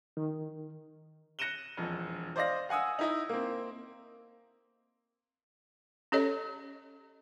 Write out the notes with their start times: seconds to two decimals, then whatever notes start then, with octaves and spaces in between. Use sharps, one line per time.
0.17 D#3
1.39 F#6 A#6 C#7 D#7 E7 G7
1.77 E1 F2
2.36 C5 D5 D#5 F5 A#6
2.69 F5 F#5 G#5 D#6 E6
2.99 D#4 E4 D#5
3.29 A#3 C4
6.12 C#4 G4 A4 C#5 D#5